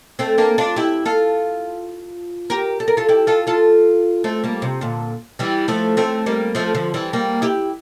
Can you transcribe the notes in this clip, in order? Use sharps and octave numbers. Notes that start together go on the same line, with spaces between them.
A3 C4
A#3 D4
D4 F4
E4 G4
F4 A4
G4 A#4
A4
A#4
F4 A4
E4 G4
F4 A4
F4 A4
A3 C4
G3 A#3
C3
A#2 D3
E3 G3
F3 A3
A3 C4
G3 A#3
F3 A3
D3 F3
E3 G3
G3 A#3
E4 G4